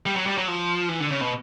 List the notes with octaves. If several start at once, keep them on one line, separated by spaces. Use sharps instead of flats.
G3
F#3
G3
F#3
F3
E3
D3
C#3
B2